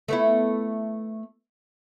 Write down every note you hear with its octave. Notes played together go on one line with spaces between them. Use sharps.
A3 B3 E4